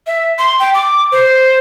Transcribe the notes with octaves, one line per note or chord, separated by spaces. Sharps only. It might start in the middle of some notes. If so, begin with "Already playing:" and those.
E5
C6
G5
D6
C5